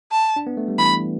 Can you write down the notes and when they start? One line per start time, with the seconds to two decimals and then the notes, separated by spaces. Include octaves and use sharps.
0.12 A5
0.36 D4
0.47 B3
0.57 A3
0.68 G3
0.78 E3 B5